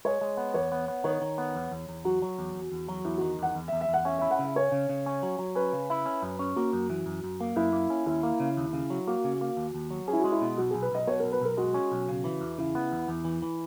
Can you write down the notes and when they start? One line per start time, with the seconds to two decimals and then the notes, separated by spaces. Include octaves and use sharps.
0.05 G#3 C#5
0.21 G#3
0.37 B3
0.54 E2 C#5
0.72 B3
0.88 B3
1.04 D#3 C#5
1.21 D#3
1.38 B3
1.55 E2
1.71 E2
1.89 E2
2.05 F#3 F#4
2.22 F#3
2.39 E2
2.55 E2
2.72 E2
2.89 F#3
3.05 E2 E4
3.18 D#3 F#4
3.39 E2 F#5
3.55 E2
3.68 E5
3.73 E2
3.81 E5
3.88 E2 F#5
4.05 C#4 E5
4.18 E4 E5
4.31 F#5
4.39 C#3 E5
4.56 C#4 C#5
4.72 C#3
4.89 C#3
5.06 C#4
5.23 F#3
5.39 F#3
5.55 C#4 B4
5.73 C#3
5.90 E4
6.06 C#4
6.22 F#2
6.39 C#4
6.56 A#3 F#4
6.73 F#2
6.90 E3
7.06 F#2
7.24 F#2
7.41 A#3
7.56 F#2 E4
7.73 A#3
7.90 C#4
8.06 D#2 E4
8.23 A#3
8.40 C#3
8.57 D#2
8.73 C#3
8.90 F#3
9.07 A#3 F#4
9.24 C#3
9.41 A#3
9.57 D#2
9.74 D#2
9.91 F#3
10.08 C#4 G#4
10.13 E4
10.20 G#3 F#4
10.32 E4
10.41 B2
10.57 B1 F#4
10.71 B1 G#4
10.82 B4
10.92 B1 D#5
11.07 B2 C#5
11.20 B1 A#4
11.32 B4
11.41 B1 A#4
11.57 G#3 F#4
11.74 C#4
11.92 B1
12.08 C#3
12.24 E3
12.41 E2
12.58 C#3 E4
12.75 B3
12.92 E2
13.08 E2
13.25 E3
13.42 E3